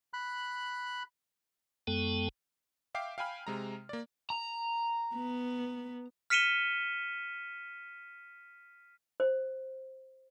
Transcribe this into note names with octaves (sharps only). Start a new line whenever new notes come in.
B5 F#6
F#2 G#3 B3 A4 G5 A5
E5 F5 G5 D6 C7
F5 G5 G#5 B5 F6
C3 G#3 A#5
A#3 D5
A#5
B3
F6 B6 C#7 D#7 E7 G7
C5